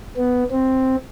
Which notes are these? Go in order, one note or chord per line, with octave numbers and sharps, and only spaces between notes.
B3
C4